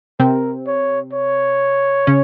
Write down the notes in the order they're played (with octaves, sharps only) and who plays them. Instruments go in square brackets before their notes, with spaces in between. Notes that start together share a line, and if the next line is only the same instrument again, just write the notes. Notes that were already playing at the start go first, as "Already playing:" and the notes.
[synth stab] C3 C4 [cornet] A#4
[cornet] C#5
C#5
[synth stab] C#3 C#4